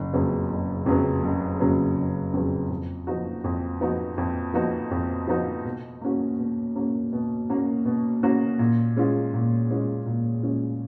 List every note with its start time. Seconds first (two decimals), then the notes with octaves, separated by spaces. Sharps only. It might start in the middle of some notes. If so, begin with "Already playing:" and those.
Already playing: F#1
0.13 F2 C#3 F#3 B3
0.50 F#1
0.86 F2 C#3 F#3 B3
1.23 F#1
1.60 F2 C#3 F#3 B3
1.97 F#1
2.34 F2 C#3 F#3 B3
2.71 F2
3.07 F3 B3 D#4 F#4
3.44 F2
3.81 F3 B3 D#4 F#4
4.18 F2
4.54 F3 B3 D#4 F#4
4.91 F2
5.28 F3 B3 D#4 F#4
5.65 B2
6.01 A#3 C#4 F#4
6.39 B2
6.76 A#3 C#4 F#4
7.13 B2
7.50 A#3 C#4 F#4
7.85 B2
8.23 A#3 C#4 F#4
8.59 A#2
8.97 G#3 C#4 F4
9.34 A#2
9.70 G#3 C#4 F4
10.06 A#2
10.43 G#3 C#4 F4